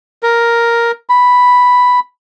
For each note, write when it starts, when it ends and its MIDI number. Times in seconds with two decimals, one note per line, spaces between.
0.23 0.92 70
1.09 2.00 83